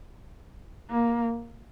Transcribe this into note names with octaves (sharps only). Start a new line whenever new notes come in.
A#3